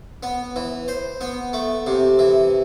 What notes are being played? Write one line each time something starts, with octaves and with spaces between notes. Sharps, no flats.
B3
E3
C5
B3
A3
C3
E3